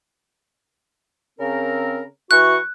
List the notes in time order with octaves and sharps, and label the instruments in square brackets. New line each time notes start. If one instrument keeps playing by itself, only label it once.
[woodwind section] C#3 C4 A#4
[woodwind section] E3 F#4 C#6 [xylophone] F#6